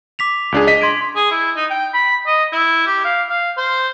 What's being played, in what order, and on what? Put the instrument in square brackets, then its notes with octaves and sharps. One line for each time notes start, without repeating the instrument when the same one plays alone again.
[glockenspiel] D6 B6 F7
[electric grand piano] C#2 D4 G#4
D#5 B6
[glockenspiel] C6 G#6 D7
[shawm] G#4
E4
D#4
G5
B5
D#5
E4
G4
F5
F5
C5